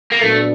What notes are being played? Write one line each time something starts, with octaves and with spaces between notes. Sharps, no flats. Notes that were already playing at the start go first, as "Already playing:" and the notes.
A#3
A#2 F#3 A3 B3 D4